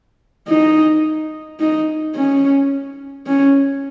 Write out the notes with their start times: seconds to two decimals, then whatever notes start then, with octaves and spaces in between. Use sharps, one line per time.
0.48 D#4
1.60 D#4
2.16 C#4
3.27 C#4